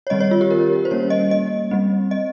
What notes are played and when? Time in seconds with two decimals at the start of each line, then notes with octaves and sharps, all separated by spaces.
0.07 C#5
0.10 D#3 G3 C4 D#5
0.20 C#5
0.31 F4
0.41 G4
0.51 A#4
0.85 C5
0.91 G3 A#3 C#4 C#5
1.10 D#5
1.31 D#5
1.71 G3 C4
2.11 D#5